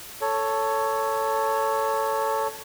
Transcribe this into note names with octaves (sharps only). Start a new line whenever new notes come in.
A4 C#5